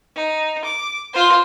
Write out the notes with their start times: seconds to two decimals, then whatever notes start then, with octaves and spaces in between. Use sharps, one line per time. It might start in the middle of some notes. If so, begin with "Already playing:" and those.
0.16 D#4
0.65 D6
1.13 F4 C5